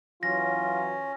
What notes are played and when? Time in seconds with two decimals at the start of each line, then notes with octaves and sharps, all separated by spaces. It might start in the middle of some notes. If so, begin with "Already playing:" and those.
0.23 E3 F#3 C#4 F4 A#6